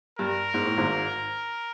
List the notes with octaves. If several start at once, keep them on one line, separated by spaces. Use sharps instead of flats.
G2 A#4
G#2
A2
G#1 G#2